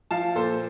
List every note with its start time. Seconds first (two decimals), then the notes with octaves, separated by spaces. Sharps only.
0.11 F3 F5 A5
0.35 A#2 A4 C5